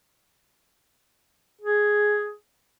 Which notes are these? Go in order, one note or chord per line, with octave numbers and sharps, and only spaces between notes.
G#4